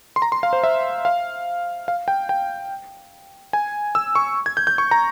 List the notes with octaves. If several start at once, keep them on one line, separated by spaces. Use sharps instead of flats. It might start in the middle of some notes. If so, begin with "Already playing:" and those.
C6
A#5
C6
F5
C5
E5
F5
F5
G5
G5
G#5
E6
C#6
G#6
G6
G6
C#6
A#5